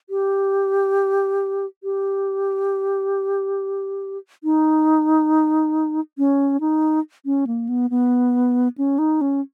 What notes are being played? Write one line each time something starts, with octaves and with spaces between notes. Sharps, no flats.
G4
G4
D#4
C#4
D#4
C#4
A#3
B3
B3
C#4
D#4
C#4